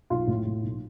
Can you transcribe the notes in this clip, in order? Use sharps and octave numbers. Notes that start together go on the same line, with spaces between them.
B1 F4
A2
A2
B1